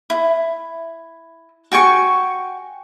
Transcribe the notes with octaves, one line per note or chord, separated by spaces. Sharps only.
E4
F#4 G5 G#5 C#6